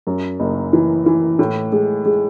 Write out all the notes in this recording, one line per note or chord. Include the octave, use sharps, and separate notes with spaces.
F#2
F#1
E3
E3
A2
G#3
G#3